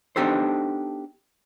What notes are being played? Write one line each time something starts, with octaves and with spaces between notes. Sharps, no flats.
B3 D4 D#4 G4 A4 C5